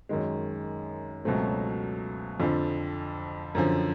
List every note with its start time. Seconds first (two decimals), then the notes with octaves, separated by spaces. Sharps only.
0.09 F#2 D#3 G#3
1.25 C#2 B2 F#3 A3 C4
2.40 F2 D3 F3
3.55 F#2 D3 F3